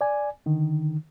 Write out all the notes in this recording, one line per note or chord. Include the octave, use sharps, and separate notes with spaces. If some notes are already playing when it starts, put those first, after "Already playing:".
D5 G#5
D3 D#3